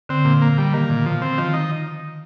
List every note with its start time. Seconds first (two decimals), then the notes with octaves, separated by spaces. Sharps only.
0.09 D3 C4
0.25 A#2
0.42 A#3
0.58 G3
0.74 D#3 A#3
0.90 A#2
1.06 F3
1.22 C4
1.38 D#3 F3
1.54 D#4